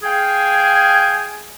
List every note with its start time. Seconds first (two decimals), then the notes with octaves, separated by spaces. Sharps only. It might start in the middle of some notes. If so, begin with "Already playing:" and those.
0.03 G#4 F5 G5 G#5